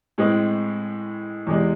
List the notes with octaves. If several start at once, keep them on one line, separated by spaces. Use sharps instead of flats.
A2 G#3 C4
E2 C3 G#3